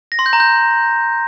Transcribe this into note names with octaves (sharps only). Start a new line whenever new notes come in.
A#6
C6
G6
A#5
G6